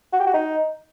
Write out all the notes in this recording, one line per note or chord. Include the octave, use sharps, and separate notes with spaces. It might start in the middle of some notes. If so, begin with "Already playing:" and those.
F#4
G4
F#4
D#4